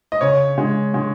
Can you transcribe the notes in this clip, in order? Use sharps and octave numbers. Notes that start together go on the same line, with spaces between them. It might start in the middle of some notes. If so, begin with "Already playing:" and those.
D#5
C#3 C#5
G#3
G#3